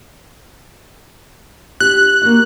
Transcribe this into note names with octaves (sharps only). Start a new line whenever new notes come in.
D4 G4 F#6
A#3 D4 F#4